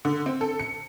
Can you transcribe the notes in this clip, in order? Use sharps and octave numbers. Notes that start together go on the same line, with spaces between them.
D3
C4
A4
C#7